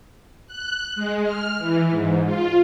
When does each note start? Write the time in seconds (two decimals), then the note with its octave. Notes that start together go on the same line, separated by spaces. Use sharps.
0.47 F#6
0.95 G#3
1.24 F6
1.58 E3
1.90 G#2
2.25 F4